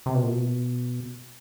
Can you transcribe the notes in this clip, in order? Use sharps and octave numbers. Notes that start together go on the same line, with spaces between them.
C3
B2
A#2
B2